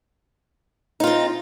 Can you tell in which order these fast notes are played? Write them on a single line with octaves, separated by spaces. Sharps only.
D#4 F4 C4